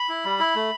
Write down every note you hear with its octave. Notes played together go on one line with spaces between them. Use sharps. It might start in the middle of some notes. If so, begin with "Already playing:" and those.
Already playing: B5
E4
G3
E4
A3